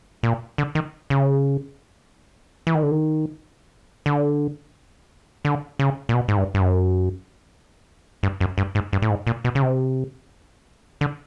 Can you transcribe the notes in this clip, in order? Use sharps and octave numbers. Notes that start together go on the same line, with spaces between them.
A#2
D3
D#3
C#3
E3
D#3
D3
D#3
D3
D3
C#3
A#2
B2
G#2
G2
G2
F#2
G2
F#2
G2
G#2
G2
A2
G#2
A#2
B2
C#3
C3
D3